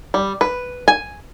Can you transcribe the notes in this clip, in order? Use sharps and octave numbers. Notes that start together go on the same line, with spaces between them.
G3
B4
G#5